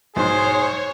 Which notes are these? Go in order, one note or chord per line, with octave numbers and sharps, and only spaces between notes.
B1 G#2 G#4 C5 C#5